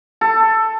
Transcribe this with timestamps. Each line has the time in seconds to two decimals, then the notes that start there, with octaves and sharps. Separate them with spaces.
0.21 A4